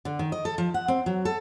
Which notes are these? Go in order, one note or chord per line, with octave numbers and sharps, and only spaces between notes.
D3
D#3
D#5
A4
F3
F#5
C4
F#3
A4